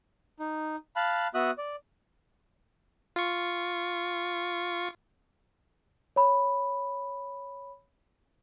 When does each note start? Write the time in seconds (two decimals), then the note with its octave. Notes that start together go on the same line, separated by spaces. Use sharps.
0.39 D#4
0.96 F5 A5 B5 F#6
1.34 B3 F#4 E5 D#6 F#6
1.58 D5
3.16 F4 C#6
6.16 C#5 B5